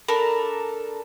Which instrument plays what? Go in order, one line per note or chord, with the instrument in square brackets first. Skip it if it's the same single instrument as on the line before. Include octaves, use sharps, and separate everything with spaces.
[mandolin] D4 A4 A#4 B5